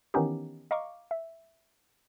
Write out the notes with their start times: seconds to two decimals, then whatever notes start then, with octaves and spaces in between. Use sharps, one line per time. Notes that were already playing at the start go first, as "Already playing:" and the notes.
0.14 D#3 E3 B3 C#4 D#4 G4
0.71 D#5 F5 A#5 C#6 D6
1.11 E5